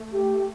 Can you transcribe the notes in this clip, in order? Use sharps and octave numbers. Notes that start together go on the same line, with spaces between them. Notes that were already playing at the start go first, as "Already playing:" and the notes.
Already playing: A3
G4